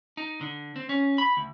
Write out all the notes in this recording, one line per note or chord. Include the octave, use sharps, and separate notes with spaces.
D#4
D3
C4
C#4
B5
D2